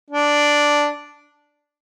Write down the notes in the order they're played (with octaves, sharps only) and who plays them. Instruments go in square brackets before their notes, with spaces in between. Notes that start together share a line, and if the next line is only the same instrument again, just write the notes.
[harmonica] D4